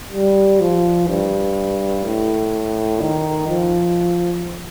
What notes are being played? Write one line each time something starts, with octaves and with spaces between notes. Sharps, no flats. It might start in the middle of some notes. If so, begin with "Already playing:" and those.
G3
F3
G2
A2
D#3
F3